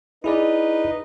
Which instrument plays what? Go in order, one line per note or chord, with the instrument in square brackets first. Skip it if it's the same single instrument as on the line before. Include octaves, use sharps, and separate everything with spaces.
[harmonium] D#4 B4 D#5 [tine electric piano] E4 G#4 D5